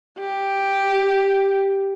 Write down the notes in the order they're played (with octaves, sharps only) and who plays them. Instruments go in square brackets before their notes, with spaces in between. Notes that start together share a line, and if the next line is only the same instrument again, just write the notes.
[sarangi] G4